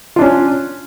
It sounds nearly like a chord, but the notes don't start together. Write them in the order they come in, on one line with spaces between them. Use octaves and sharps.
F4 D4 C#4